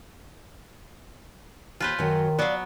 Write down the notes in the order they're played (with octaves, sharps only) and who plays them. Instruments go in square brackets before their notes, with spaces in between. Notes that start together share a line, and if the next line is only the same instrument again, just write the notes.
[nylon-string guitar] D#2 [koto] F4 B4 C5
[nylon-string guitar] F#2 F#3 [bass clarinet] D#3
[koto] F#3 B3 [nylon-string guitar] D5 F5